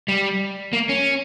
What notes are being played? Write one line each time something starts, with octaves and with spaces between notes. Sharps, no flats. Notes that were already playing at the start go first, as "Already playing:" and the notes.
G3
A#3
C#4